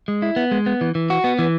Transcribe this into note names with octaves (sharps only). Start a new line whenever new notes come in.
G#3
E4
B3
G#3
B3
E3
E3
F#4
B3
E3